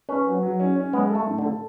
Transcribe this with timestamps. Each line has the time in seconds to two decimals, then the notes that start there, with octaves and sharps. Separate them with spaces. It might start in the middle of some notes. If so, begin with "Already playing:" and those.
0.09 C#4 B4
0.25 F#3
0.43 F#3
0.60 C#4
0.76 C#4
0.93 G#3 B3
1.09 A4
1.15 A3
1.27 A2
1.38 D3
1.44 A4